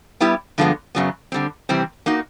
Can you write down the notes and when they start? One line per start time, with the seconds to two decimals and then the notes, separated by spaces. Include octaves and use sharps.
0.20 G3 B3 E4 G4
0.58 G2 D3 F3 G#3 B3
0.95 F#2 C#3 F#3 B3
1.32 D3 G3 C4
1.69 C3 E3 G3 C4
2.06 A#3 D#4 F#4